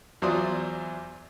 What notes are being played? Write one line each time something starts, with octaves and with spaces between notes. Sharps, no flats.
E2 F#3 F4 C5 D5 D#6